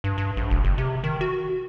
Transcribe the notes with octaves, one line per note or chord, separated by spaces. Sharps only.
G2
G2
A#1
E1
F#1
C3
D#3
F#4